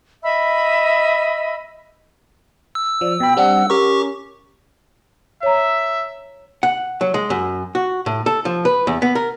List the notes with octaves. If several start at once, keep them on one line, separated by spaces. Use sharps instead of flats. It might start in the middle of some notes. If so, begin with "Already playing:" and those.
D#5 E5 B5 E6
E6
F3 D5
B2 G5 B5
G3 C4 D4 F#5
C#4 G4 A#4 C#6
C#5 E5 A#5
F#5
F#3
G#3
F#2
F#4
A2
A4
F3
B4
E2
B3
A#4